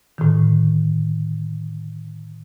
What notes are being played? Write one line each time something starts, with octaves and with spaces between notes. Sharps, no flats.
A2 D3 D#3